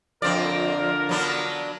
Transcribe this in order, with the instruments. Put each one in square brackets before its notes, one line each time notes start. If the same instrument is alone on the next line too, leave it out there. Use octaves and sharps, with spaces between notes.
[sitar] F2 C4 D5 [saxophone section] D3 F4 A#4
[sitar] F#3 B3 D4